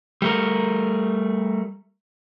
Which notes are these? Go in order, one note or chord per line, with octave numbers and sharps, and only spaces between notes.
G3 A3 A#4